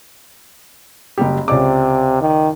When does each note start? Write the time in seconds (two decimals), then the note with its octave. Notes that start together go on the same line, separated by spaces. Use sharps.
1.18 F#1 G3 G4
1.48 C#2 C3 D5 D6
2.21 D#3